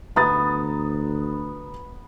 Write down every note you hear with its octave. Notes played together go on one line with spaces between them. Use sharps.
D2 B3 A#5 D#6 A6